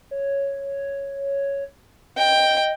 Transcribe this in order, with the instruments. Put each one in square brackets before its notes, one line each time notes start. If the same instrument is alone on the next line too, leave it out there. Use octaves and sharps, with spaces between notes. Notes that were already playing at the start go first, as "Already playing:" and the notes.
[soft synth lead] C#5
[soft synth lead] D#5 [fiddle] G5